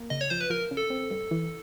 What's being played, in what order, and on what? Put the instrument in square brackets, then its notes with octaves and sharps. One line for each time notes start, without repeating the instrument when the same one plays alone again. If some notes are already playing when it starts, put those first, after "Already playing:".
Already playing: [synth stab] A#3
[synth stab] C#3 [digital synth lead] D#5
[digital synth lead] C#5
[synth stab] F3 [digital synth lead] C5
[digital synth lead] B4
[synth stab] F3 [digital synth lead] A#4
[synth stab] C#3
[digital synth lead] A4
[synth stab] C4
G2
E3